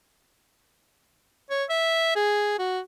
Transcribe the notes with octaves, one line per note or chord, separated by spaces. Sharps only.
C#5
E5
G#4
F#4